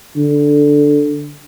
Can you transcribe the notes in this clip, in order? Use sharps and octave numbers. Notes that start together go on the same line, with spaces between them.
D3